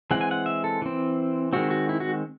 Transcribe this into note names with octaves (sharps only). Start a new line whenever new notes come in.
E3 G#3 C4 F#5
G#5
F#5
E5
A4
E3 C4
D#3 G#3 C4 F#4
F#4
E4
F#4